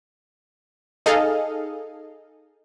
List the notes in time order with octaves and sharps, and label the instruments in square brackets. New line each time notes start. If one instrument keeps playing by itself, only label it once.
[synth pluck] D#4 G#4 A4 D#5 F5